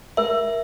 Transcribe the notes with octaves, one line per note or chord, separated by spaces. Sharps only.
A#4 E5